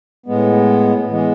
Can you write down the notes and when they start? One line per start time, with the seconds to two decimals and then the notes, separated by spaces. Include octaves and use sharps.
0.26 A2 G#3 B3
1.10 E3 G#3 B3